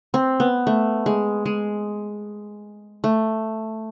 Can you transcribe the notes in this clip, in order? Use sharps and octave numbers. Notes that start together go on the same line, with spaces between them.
C4
B3
A3
G#3
G#3
A3